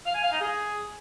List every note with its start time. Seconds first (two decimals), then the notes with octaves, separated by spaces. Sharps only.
0.06 F5
0.15 G#5
0.23 F5
0.32 D#4
0.41 G#4